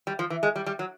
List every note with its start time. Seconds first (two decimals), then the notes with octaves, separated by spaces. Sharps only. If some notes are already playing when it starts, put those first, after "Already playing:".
0.07 G3
0.19 F3
0.30 E3
0.43 G#3
0.56 G3
0.66 G3
0.79 F#3